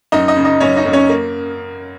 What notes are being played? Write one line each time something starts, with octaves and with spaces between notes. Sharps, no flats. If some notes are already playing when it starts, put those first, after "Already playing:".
F#2 D#4 D#5
D#4 D#5
C#3
D#4 D#5
F#2 C#4 C#5
D#4 D#5
F#2
C#4 C#5
A#3